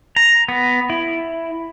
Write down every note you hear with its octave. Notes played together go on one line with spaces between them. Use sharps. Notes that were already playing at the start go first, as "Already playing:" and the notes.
A#5
B3
E4